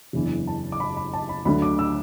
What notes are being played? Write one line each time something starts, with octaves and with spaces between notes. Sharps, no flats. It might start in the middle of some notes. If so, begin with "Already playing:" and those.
F#1 E2 E3 D4
A5
D6
B5
B5
A5
B5
D2 D3 F#3 A3 D4 B5
D6
E6